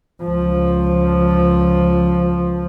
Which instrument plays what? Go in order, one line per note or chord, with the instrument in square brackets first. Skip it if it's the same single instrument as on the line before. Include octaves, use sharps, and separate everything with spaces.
[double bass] C#2 F3